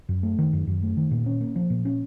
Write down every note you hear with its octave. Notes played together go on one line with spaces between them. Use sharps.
F#2
A3
D#3
F#2
F#2
A3
D#3
A#2
C#4
A#3
F3
A#2
C#4